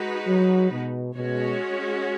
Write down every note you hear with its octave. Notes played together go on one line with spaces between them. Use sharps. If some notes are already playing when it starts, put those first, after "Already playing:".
Already playing: G#3 D#4 F#4 B4
F#3
B2
B2 G#3 C#4 F#4 C#5